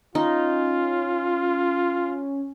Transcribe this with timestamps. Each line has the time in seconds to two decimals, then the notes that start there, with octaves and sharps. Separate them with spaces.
0.15 C#4 D#4 F4